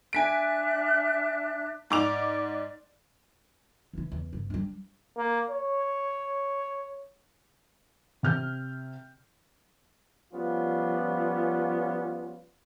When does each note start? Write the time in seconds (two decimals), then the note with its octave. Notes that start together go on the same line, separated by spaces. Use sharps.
0.13 D4 E5 G#5 F#6 B6 D7
1.90 G#2 D5 D6 F7
3.93 E3 E4
4.12 E2
4.33 G1
4.50 G3 D4
5.17 A#3
5.50 C#5
8.23 C3 F6 G6
10.34 F3 G3 B3 C#4 F4